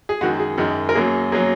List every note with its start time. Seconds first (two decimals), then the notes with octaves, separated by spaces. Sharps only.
0.09 G#4
0.21 F#2 D#3 G#3 F#4
0.40 G#4
0.58 F#2 D#3 G#3
0.89 A#4
0.95 F#2 F#3 A#3 G#4
1.32 F#3 A#3 G#4